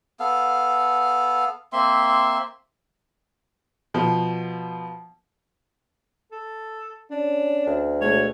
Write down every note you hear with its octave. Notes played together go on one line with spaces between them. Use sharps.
B3 A4 F5
A#3 C4 E5 C6
B2 F3
A4
C#4 D4
D2
B2 G#3 A3 C#5